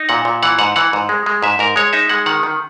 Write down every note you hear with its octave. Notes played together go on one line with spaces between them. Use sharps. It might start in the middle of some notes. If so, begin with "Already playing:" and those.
Already playing: D#4
A#2 F#5
A#2
E3 F#5
G#2 F#5
E3 F#5
G#2
G#3
G#3
G#2 E5
G#2 A#4
G#3 C#5
D#4 E5
G#3 F#5
D#3 F#5
D#3